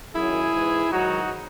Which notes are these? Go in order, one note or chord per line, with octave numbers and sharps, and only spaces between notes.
F#2 D#3 F#3 E4 G#4
G#2 E3
G#2 D#3 F#3 D#4 F#4